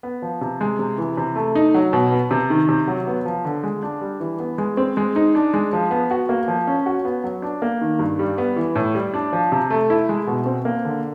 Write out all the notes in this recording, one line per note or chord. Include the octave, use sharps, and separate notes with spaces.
B3
F3
C3
G#3
C3
E3
C3
A3
D#4
F#3
B2
B3
C3
D#3
C3
F#3
B3
F3
D3
G#3
D4
G3
E3
B3
G#3
C4
G#3
D#4
D4
G#3
F3
B3
F#4
A#3
F3
C#4
F#4
B3
F#3
D4
A#3
D#3
G2
G3
B3
E3
A2
G3
D4
F3
C3
A3
E4
G#3
B2
C4
A#3
D3